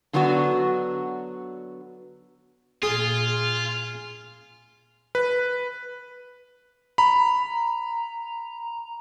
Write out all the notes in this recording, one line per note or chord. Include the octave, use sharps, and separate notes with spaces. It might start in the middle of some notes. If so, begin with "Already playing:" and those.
D3 F#3 B3 D4 F#4
A#2 F4 G#4
B4
A#5 B5